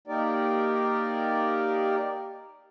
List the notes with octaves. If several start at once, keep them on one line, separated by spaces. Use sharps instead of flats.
A#3 D#4 G4 A#4 D5